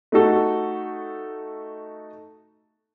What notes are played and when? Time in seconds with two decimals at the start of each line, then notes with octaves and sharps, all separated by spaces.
0.12 A3 D#4 F#4 A4